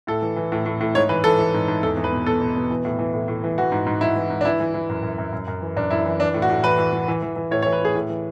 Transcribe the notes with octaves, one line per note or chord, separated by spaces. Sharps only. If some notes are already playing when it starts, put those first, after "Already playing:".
A2 A4
E3
E3
A2
A2
A2
G#2 C#5
E3 B4
E3 A4
E3
G#2
G#2
E2 A4
E2
B4
B2
B2 A4
B2
B2
E3
A2
E3
A2
A2
E3
E3 F#4
G#2
G#2
G#2 E4
E3
G#2
D4
E3 E4
E3
E3
F#2
F#2
F#2
F#2
F#2
E3
F#2 D4
F#2 E4
E3
E3 D4
A2
F#4
A2
E3 B4
E3
E3
E3
E3
E3
A2 C#5
C#5
E3
B4
A2 G#4
A2
E3